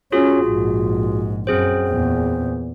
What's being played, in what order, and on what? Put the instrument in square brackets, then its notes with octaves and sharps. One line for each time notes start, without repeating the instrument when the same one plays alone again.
[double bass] C#4 [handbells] F4 F#4 G#4
[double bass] A#1 G#2
[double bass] F#2 [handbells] C4 G#4 C5
[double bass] E2 A#2